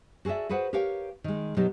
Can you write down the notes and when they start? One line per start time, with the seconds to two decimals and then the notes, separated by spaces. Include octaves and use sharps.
0.25 F#4 G#4 A4 D5 E5
0.49 F#4 G#4 B4 C5 F#5
0.73 G4 A#4 B4 C#5 F5 G5
1.24 D#3 G#3
1.56 B2 F#3 D#4 G4